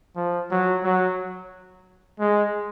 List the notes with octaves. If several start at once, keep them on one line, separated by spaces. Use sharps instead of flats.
F3
F#3
F#3
G#3